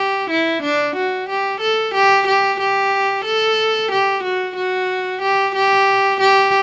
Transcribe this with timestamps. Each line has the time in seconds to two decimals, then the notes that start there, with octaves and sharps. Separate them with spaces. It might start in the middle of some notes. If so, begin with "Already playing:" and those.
Already playing: G4
0.30 E4
0.62 D4
0.95 F#4
1.29 G4
1.61 A4
1.94 G4
2.27 G4
2.60 G4
3.25 A4
3.91 G4
4.23 F#4
4.56 F#4
5.22 G4
5.55 G4
6.20 G4